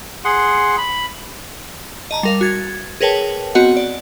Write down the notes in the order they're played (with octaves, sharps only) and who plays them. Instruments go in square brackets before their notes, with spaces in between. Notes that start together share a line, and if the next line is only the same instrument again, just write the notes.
[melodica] G#4 F#5 C6
B5
[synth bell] D#5 A5 A#5
G3 A#4 F5
F#4 G#6 A6
G#4 A#4 B4 C#5 G5 A5
B3 C4 F#4 D#5 F#5
D5